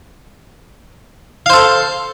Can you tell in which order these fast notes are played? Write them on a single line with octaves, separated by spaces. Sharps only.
F5 C5 A4